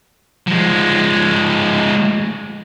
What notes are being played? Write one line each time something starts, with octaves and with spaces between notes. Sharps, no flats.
F3 G#3